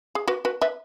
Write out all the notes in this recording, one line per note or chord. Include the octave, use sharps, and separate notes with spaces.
G#4
F#4 B4
F#4 B4
B4 E5